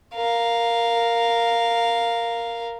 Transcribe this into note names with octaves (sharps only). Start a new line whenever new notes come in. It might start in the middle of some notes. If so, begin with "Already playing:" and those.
A#4 F5